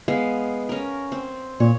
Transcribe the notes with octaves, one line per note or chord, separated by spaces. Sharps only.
G#3 B3 F5
C#4 A#4
C4
A#2 C#5